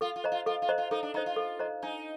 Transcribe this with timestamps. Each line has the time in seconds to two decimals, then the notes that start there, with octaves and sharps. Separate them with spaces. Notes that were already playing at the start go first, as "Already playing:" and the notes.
0.01 F4 A4
0.16 F4
0.24 C5 D#5 A#5
0.32 F4
0.46 F4 A4
0.62 F4
0.69 C5 D#5 A#5
0.78 F4
0.91 D#4 A4
1.03 D4
1.14 D#4 C5 D#5 A#5
1.26 F4
1.36 A4
1.59 C5 D#5 A#5
1.82 D4 D#4